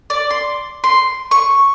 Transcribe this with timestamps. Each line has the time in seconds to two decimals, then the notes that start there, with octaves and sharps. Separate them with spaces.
0.10 D5
0.31 C6
0.84 C6
1.31 C#6